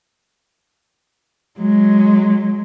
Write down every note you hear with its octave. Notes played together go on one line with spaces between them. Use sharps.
F#3 G#3